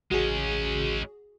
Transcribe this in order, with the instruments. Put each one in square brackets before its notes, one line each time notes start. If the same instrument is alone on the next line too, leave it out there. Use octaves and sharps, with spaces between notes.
[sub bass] A1 [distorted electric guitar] G#3 C#4 [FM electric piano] F#4 G#4